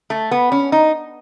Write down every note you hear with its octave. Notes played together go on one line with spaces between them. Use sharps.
A3
B3
C#4
D#4